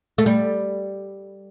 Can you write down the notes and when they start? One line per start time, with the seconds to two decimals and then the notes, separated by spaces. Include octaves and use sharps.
0.18 A3
0.26 G3